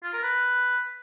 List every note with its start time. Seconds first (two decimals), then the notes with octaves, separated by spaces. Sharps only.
0.03 F4
0.13 A#4
0.23 B4